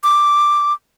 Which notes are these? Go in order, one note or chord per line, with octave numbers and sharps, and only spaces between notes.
D6